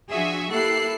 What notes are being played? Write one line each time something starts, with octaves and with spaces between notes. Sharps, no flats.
F3 D4 F#4 G#4 E5 G#5
A#3 E4 G4 A4 F#6 C7